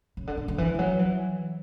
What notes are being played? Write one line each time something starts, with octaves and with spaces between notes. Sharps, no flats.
C#3
D3
D3
D3
E3
E3
F#3
E3